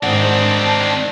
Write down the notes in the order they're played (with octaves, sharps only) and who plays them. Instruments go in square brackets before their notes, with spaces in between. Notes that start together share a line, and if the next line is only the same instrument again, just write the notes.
[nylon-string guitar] G#2 F#5 [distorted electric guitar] D#3 C4 [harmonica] D5 A5